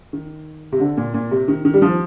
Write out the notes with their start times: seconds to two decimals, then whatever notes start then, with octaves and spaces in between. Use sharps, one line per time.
0.13 D#3
0.72 C3
0.80 D3
0.97 A#2
1.14 A#2
1.31 C3
1.48 D#3
1.65 D#3
1.74 G3
1.82 F3